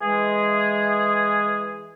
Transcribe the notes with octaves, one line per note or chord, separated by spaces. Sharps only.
E3 G#3 G#4